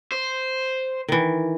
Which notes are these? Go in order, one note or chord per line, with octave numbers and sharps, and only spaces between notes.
C5
D#3 E3